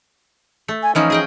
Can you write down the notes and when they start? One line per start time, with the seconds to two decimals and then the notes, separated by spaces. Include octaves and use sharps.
0.68 A3
0.83 G#5
0.95 E3 F3 C#4 D#4
1.10 G#4 D#5 G5